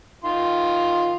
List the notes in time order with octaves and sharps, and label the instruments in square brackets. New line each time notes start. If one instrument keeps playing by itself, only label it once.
[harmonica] D#3 F4 C6